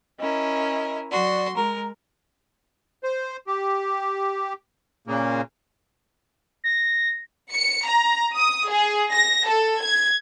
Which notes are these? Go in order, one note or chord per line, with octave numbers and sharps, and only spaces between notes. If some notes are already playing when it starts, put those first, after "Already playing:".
C#4 E4 A#4 D#5
F#3 F#4 D5 C6
G#3 A#4 A#5
C5
G4
A#2 C#3 A#3
A#6
C#7
A#5
D#6
G#4
A#6
A4
G#6